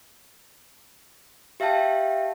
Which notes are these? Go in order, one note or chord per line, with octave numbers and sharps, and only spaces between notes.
G4 E5 F5 G5 A5